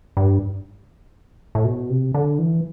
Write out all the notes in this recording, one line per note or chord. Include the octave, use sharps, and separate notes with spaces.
G2
A2
B2
C3
D3
E3